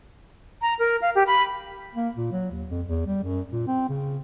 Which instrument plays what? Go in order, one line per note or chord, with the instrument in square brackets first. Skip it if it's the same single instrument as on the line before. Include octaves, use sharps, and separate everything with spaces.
[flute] A#5
A#4
F5
G4
B5
[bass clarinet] A#3
A#2
F#3
D#2
F2
E2
G3
F#2
A#2
C4
C#3